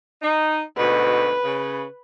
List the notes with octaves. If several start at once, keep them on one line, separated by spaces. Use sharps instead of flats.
D#4
D2 G#2 B2 B4
C#3